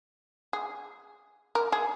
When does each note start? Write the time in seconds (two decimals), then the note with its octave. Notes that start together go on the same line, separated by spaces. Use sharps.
0.53 G#4
1.55 A#4
1.72 G#4